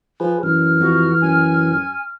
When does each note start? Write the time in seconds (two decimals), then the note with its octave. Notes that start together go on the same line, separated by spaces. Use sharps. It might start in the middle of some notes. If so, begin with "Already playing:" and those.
0.20 F3 G#4 B4
0.43 F#2 E3 F6
0.80 F2 F#4
1.22 F#2 G#5